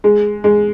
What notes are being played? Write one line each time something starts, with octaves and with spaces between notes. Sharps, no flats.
G#3
G#3